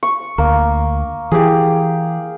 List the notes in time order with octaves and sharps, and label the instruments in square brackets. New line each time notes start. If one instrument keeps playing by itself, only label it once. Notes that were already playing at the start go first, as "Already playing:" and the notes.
[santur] C#6
[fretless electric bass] D2 [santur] A#3
[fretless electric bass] E3 [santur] G4 G#4